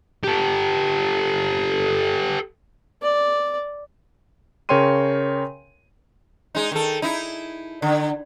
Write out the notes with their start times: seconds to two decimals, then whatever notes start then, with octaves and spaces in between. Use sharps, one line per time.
0.24 G4 A4
3.02 D5
4.69 C#3 A#4 C#5 G5 C6 D#7
6.55 G#3 D#4
6.72 D#3 A4
7.02 D#4 E4
7.82 D3